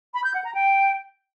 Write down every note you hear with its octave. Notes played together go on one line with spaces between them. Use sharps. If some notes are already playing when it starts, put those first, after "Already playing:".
B5
G6
F#5
A#5
G5